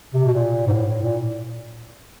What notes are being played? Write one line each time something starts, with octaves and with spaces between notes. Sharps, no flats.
C3
B2
A#2
G#2
A2
A2
A#2